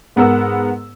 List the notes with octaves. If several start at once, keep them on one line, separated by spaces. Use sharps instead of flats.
G#2 B3 A#4 F#5 E6